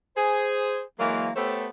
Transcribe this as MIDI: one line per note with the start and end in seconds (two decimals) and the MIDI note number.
0.17 0.81 68
0.17 0.81 72
0.99 1.30 52
0.99 1.30 54
0.99 1.30 56
0.99 1.30 58
1.36 1.67 57
1.36 1.67 59
1.36 1.67 67
1.36 1.67 69
1.36 1.67 72
1.36 1.67 73